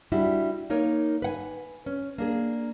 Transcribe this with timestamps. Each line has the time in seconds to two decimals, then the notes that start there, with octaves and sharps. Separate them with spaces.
0.12 G3 D4 E4 F#4
0.70 A#3 D#4 A#4 C#5
1.22 B4 F#5 G#5
1.86 C#4
2.18 A#3 D4 G#4